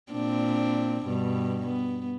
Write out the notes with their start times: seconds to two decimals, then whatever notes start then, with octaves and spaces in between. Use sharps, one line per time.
0.11 A#2 C4 D4
1.06 G2 B2
1.64 B3